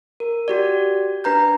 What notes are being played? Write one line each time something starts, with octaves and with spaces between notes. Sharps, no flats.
A#4
F#4 G4 D5
D4 B4 A#5 G6